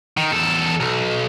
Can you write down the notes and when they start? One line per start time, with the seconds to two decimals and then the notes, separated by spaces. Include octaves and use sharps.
0.17 D#3
0.32 E2 A4
0.80 B1